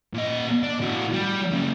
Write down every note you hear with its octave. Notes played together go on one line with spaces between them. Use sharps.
A#2 D#5
D4
A2 F#4
G3
F#2 C#3